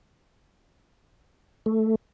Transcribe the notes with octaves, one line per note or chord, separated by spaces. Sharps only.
A3